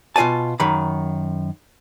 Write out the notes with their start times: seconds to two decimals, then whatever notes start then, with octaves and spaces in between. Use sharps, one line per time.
0.16 B2 F4 D5 G#5 A5
0.60 F#2 D#3 B5